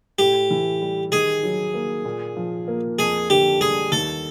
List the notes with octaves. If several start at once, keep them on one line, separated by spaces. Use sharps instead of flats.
A2 G4
E3
G3
D#3 G#4
F#3
A#3
A#2
F3
A#3
F2 G#4
D3 G4
G3 G#4
D#2 A4